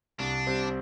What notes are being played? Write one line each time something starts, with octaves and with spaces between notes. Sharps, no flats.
C2 D4
C3 G3 C4